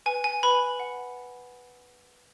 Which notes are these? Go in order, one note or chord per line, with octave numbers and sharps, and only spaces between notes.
B4 G#5
G#5
B4 B5
F#5